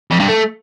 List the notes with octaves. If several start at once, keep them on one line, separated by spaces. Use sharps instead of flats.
F2
G2
A3